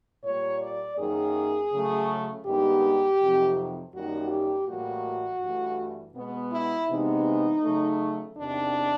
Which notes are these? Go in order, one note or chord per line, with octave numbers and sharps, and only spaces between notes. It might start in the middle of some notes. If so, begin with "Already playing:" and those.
A#2 G3 A#3 C#5
D5
F#2 D#3 F#3 A#3 G#4
C#3 F#3 A3
G2 D#3 G#3 B3 G4
F2 C3 D#3 F#3
F#2 D#3 G3 A#3 F#4
G4
A2 E3 G3 A#3 F#4
G2 E3 A3
B2 G#3 B3
E4
C3 E3 G#3 B3 D#4
C#3 F#3 A3
E2 C3 D#3 D4